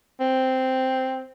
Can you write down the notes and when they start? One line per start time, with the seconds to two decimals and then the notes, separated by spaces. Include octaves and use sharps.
0.20 C4